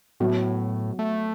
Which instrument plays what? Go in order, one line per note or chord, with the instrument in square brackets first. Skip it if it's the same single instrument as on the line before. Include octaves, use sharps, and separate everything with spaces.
[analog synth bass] A2 [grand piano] F#3 B3 F#4
[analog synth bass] A3